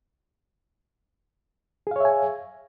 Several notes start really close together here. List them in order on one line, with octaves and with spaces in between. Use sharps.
G#4 F5 C#5 E5 G#5